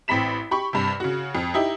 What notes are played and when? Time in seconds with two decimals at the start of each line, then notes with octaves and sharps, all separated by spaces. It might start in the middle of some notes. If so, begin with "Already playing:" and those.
0.08 A1 C4 B5 B6 E7
0.51 G4 B5 C#6
0.73 G2 C3
1.00 C#3 F#4
1.35 F2
1.54 D#4 E4 G4